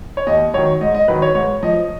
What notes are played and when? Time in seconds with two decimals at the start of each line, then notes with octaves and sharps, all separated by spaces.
0.17 C#5
0.27 D#2 D#5
0.54 D#3 F#3 C#5
0.81 G#2 D#5
0.95 D#5
1.08 D#3 F#3 B4
1.22 C#5
1.35 G#2 C#5
1.63 F3 D#5